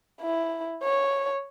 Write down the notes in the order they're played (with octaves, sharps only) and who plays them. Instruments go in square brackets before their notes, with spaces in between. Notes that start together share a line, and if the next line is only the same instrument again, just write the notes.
[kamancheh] E4
C#5